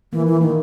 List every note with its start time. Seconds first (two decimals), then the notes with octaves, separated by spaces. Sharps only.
0.12 E3 A#3
0.27 E3
0.41 D#3 A#3